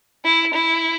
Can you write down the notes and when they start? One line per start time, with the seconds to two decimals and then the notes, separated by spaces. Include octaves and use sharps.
0.25 E4
0.54 E4